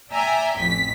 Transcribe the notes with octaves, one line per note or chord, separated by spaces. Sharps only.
D5 E5 G5 G#5 A#5
A1 F2 B6